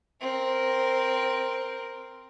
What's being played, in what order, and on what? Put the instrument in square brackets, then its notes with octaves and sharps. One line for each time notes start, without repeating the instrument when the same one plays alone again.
[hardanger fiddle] C4 A#4